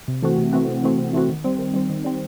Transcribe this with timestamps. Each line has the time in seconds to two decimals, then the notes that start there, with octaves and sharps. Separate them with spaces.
0.08 C3
0.23 E3 A3 C4 F#4
0.37 C3
0.53 E3 A3 C4 F#4
0.68 C3
0.83 E3 A3 C4 F#4
0.99 C3
1.13 E3 A3 C4 F#4
1.29 D#3
1.44 G3 C4
1.58 D#3
1.74 G3 C4
1.89 D#3
2.04 G3 C4